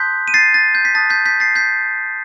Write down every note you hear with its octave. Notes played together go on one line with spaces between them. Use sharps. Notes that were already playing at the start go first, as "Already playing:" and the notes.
Already playing: A5 C6 D#6 F#6 G6 B6
D#7
A6 C7
A6
G6
B6
A5 D#6 F#6 A6
G6 B6
G6 B6
A6 C7
G6 B6